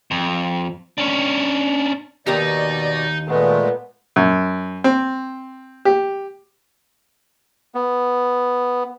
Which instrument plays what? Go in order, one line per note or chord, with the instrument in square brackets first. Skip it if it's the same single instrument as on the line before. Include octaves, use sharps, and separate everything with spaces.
[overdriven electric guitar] F2
C#4 D4
[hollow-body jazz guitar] D#2 G4 A#4 [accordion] B2 D5 [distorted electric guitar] D#4
[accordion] A#2 G#3 A3 [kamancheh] B3
[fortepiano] F#2
C4
G4
[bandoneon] B3